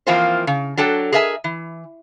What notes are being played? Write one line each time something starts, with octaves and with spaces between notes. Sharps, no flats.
E3 F3 A#3 C4 F4 C5
C#3
F#3 D4 A4 G5
G#4 A#4 D#5 E5 G#5
E3